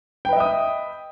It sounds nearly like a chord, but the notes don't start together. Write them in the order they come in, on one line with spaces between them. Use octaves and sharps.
G5 B4 D#5 E5 D#6